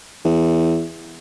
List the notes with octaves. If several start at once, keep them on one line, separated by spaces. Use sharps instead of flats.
E2